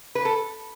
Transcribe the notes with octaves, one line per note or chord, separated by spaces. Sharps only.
B4
A4